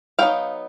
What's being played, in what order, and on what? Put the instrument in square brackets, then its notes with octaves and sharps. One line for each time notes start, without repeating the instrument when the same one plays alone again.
[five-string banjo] F#3 B3 D#4 F5 G5